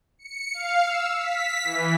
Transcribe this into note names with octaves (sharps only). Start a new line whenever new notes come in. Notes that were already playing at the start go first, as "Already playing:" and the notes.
C#7
F5
E6
B6
E3